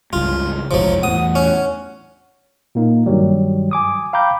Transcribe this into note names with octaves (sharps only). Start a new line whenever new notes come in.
C#2 G2 F4
F1 B1 G#2 F3 F#3
E2 A2 F#5 D#6
C#4
A#2 A#3 D#4
G2 D#3 F#3 G3
G#5 D6 D#6
F5 G5 A#5 B5 D6 G6